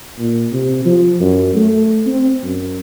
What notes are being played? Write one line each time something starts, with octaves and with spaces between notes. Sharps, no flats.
A#2
C3
F3
F#2
A3
C4
F#2